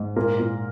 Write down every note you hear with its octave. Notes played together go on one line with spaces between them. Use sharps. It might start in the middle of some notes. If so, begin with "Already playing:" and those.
Already playing: G#2
A#2 A#4
A#2